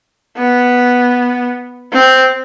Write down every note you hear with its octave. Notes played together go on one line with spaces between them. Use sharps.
B3
C4